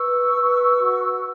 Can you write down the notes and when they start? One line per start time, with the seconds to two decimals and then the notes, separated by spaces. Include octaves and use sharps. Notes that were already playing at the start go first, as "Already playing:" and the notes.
Already playing: B4 C#6 E6
0.34 B4
0.79 F#4